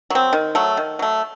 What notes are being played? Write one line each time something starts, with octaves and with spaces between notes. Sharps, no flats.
F#3 C4
D#3
F#3 A3
D#3
F#3 A3